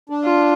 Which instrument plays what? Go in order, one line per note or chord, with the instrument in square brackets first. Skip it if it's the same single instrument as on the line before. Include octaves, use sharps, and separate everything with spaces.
[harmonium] D4
[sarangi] F4